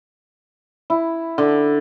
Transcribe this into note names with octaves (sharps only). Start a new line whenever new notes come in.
E4
D3